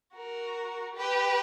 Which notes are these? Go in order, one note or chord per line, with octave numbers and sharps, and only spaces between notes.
F#4 A#4
G4 B4